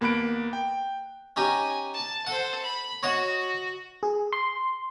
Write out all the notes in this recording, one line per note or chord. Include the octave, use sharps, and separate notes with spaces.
D#2 A#3 B3 B5 F#6 D7
G5
C#4 D#4 G4 G#5
A5
A4 C5 F#5
B5
F#4 C#5 D#5 F#5
G#4
C6